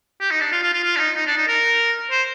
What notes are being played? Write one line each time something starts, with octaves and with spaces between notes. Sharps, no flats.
G4
D#4
D4
F4
F4
F4
F4
D4
D#4
D#4
D4
D#4
A#4
C5